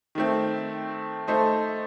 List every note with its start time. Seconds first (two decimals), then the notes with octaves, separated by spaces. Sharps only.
0.15 D#3 A3 C4
1.28 A3 D#4 A4 C5